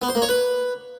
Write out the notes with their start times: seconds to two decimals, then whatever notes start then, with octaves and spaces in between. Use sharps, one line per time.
0.02 B3
0.08 C5
0.15 A#3
0.22 C#5
0.29 B4